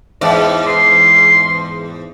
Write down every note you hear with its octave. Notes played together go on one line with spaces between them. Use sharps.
E2 G#2 D5
C6